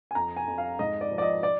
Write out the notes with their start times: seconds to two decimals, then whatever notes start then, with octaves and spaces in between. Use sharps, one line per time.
0.11 G#5
0.15 F2 A#5
0.37 G#5
0.48 F2
0.58 F5
0.79 G#2 D#5
1.01 D5
1.11 F3
1.18 D5
1.22 D#5
1.43 D5